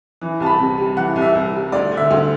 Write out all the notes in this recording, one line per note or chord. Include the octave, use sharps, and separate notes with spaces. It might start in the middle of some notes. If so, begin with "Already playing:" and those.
E3
C2 A5
B5
C3
G3
E3 F#5
C2
E5
C2
G3
D2 D5
D3
E5
D2